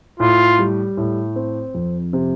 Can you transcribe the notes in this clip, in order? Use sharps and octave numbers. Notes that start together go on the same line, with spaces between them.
A2 F4
G3
A2
C4
F2
C3